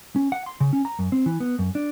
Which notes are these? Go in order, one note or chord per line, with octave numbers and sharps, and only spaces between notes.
C#4
F#5
C6
C#3
C#4
A#5
F#2
C4
E3
B3
F#2
D4